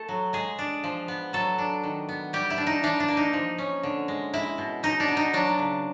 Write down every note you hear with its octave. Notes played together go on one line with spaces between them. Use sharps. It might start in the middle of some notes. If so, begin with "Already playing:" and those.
Already playing: A3 A4
F#3
G#3 G#4
D4
F3
B3
F#3 A4
D4
D#3
B3
G3 G4
E4
D4
D#4
E3 D4
D4
A#3
D#4
F3
C#4
D3
G#3
G#3 E4
B2
B2 D#4
D4
B3
D#4
F#3 D4
C#3